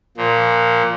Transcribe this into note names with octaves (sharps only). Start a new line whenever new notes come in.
A#2 F3